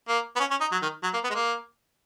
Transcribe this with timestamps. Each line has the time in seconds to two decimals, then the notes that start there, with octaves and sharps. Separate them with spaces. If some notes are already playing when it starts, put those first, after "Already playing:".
0.08 A#3
0.36 B3
0.40 C#4
0.50 C#4
0.61 D#4
0.72 F#3
0.82 D#3
1.03 F#3
1.13 A#3
1.24 B3
1.30 G#3
1.35 A#3